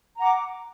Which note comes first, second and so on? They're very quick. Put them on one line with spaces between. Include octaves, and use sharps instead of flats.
A#5 F#5 D6